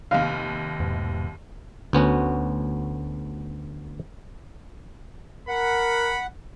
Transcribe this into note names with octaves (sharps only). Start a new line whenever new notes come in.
F1 D#2 F5
E2 G#2 B2
D2 B3 C#4 F#4
A#4 F#5 B5